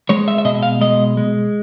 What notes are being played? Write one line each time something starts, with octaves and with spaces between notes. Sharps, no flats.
G#3 C#5
E5
E5
B2 D#5
F5
G#3 D#5
G#3